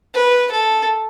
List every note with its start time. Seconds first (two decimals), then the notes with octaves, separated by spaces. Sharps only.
0.14 B4
0.52 A4